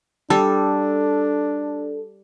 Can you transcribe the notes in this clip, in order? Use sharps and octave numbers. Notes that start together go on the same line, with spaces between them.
G3 D4 A4